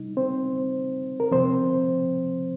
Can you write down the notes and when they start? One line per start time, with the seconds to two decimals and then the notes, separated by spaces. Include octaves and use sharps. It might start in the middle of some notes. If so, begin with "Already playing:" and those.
Already playing: C3 G3 D#4
0.17 C4 C5
1.20 A#4
1.31 C3 F3 C4 C5